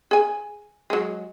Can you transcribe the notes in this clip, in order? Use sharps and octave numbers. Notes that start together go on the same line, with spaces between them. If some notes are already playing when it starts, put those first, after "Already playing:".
G#4 G#5
F#3 G#3